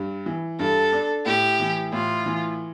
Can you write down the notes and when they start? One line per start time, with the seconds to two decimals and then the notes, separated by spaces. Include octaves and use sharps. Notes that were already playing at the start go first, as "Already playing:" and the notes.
Already playing: G2 G3
0.26 E3
0.59 G2 A4
0.92 D4
1.26 A2 G4
1.60 E3
1.92 A2 F4
2.26 E3